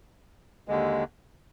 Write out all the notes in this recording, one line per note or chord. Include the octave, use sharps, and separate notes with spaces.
D#2 D3 G#3